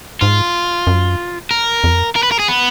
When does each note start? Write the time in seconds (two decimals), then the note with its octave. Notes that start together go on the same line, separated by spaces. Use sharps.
0.21 G#2 F4
0.87 F#2
1.51 A#4
1.84 F2
2.16 A#4
2.23 B4
2.32 A#4
2.39 G#4
2.48 B3